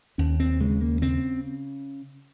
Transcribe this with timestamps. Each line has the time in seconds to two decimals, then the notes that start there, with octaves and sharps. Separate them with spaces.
0.18 D#2 C#4
0.40 C4
0.60 C#3 G#3
0.81 A#3
1.02 C#3 C4